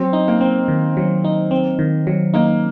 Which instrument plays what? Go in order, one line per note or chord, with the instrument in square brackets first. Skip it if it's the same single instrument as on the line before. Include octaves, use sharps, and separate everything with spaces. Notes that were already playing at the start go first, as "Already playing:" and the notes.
Already playing: [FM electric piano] F#3 [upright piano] C4
[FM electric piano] D#4
[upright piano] A#3
[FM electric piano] C4
D#3
F#3
D#4
C4
D#3
F#3
[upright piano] A#3 [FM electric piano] D#4